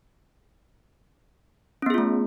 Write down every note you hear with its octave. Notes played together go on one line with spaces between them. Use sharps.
A3 B3 C#4 F4 G#4